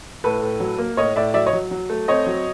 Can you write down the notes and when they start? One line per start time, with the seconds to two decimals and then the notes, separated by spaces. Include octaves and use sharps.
0.24 A2 A4 B4
0.42 A2
0.60 F#3
0.79 A#3
0.97 A2 C#5 D#5
1.16 A2 D5 E5
1.34 F#3 D5 E5
1.46 C#5 D#5
1.53 F#3
1.71 F#3
1.90 A3
2.08 C4 C#5 D#5
2.27 F#3